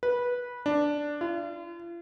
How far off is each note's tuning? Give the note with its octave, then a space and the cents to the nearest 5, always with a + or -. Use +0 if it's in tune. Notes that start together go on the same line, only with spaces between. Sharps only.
B4 -15
D4 +0
F4 -40